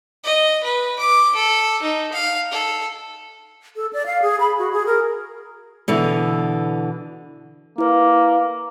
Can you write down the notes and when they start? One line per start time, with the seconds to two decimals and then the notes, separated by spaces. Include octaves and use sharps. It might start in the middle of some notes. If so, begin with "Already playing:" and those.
0.24 D#5
0.63 B4
0.99 D6
1.35 A4
1.82 D#4
2.12 F5
2.51 A4
3.76 A4
3.93 D5
4.06 F5
4.22 G#4
4.40 B5
4.58 F#4
4.73 G#4
4.86 A#4
5.88 B2 D3 E3
7.78 A#3 E4 B4